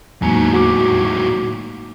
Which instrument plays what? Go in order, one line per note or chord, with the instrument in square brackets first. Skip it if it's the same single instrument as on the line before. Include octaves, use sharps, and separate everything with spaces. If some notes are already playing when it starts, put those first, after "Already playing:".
[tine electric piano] E2 [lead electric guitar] A2 F#3 [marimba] G#3 A#3 D#4
[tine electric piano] F#4 D6